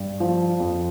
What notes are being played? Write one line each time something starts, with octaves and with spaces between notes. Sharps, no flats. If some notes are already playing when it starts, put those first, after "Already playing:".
Already playing: G2
F3
F2